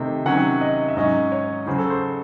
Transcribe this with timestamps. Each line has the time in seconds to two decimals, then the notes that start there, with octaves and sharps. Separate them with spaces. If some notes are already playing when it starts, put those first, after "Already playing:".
Already playing: C3 D#3 A3 C4 D#4
0.26 C3 D#3 F#3 C#4 F#5
0.61 D#5
0.88 E5
0.96 G#2 F#3 C#4 D#5
1.32 C#5
1.67 C#3 F#3 C#4 C5
1.78 A4
1.90 C5